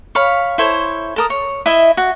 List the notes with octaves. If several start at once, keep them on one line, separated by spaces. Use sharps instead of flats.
C#5 F5 B5
E4 A4 C5 C#5
A4 A#4 D#6
C#5
E4 D#5 E5
F#4